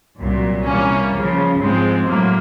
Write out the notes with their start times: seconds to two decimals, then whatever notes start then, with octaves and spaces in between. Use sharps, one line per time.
0.18 C2 A#2 F#3
0.65 C3 E3 G3 A#3 C#4
1.12 C#2 C#3 F3
1.61 G#2 F3 G#3 C4
2.08 A2 F#3 A#3